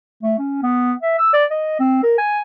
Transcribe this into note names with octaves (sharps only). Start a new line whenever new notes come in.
A3
C#4
B3
E5
E6
D5
D#5
C4
A#4
G#5